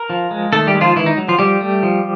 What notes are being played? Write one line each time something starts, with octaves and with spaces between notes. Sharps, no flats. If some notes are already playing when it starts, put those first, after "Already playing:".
Already playing: A#4
F3
G#3
D#3 A3 A4
G3 G4
G#3
F3 F4
D#3 E3 E4
D#4
F#3
F3 F4
F3 G3 G4
A3
F3